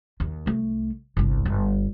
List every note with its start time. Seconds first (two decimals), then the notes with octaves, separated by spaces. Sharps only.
0.20 D#2
0.46 C2 A3
1.17 G1 C2
1.45 G1